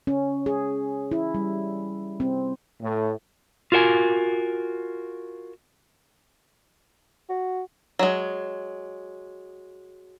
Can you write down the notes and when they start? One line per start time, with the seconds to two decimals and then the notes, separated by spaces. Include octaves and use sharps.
0.07 C#4
0.46 G#4
1.11 E4
1.34 G3
2.20 C4
2.81 A2
3.72 F4 F#4 A#4 F5 G#5
7.29 F#4
7.99 F#3 G#3